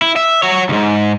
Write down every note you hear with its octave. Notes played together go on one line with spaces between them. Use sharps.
E4
E5
F#4 C#5
D2 G#2